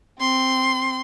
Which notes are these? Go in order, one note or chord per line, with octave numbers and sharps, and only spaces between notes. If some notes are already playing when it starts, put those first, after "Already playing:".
C4 C6